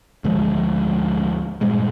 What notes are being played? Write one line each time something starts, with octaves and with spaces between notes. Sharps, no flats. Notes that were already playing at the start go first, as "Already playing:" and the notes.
D2 G#2 F3 G#3
G2 A#2 G3 G#3